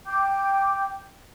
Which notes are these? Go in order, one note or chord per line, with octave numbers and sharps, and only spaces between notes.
G5 D6 G6